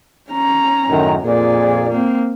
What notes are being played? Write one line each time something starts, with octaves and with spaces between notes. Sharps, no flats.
C#4 A#5
F#2 A2 D#3
F2 A#2 G#4 D5
A#3 C4